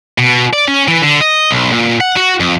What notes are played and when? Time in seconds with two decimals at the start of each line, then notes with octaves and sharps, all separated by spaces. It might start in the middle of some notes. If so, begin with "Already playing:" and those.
0.18 B2
0.53 D5
0.68 C#4
0.88 E3
1.02 D3
1.21 D#5
1.51 B1
1.72 A#2
2.01 F#5
2.17 F#4
2.40 F2